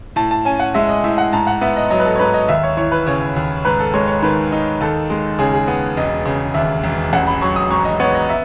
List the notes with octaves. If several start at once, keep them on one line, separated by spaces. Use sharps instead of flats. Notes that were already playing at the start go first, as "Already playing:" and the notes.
A2 A5
A5
C#4 G#5
F#5
G#3 E5
D#5
A2 E5
F#5
G#2 A5
F#5
B3 E5
D#5
F#3 D#5
B4
A4
C#5
G#2 B4
D#5
D#2 E5
C#5
E3 C#5
B4
C#3 C#5
D#2
G#2 B4
A4
G#3 C#5
C#5
D#3 B4
D#4
D#2 A4
G#3
C#3 G#4
G#4
B3
E1 D#5
C#3
D#2 E5
E1
A1 F#5
B5
F#3 C#6
D#6
G#2 C#6
D#5
B3 C#5
D#5
E5